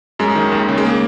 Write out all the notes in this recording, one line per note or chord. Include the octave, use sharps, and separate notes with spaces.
F#2 G#3
D#3
D#2
C#3
G#3
A#3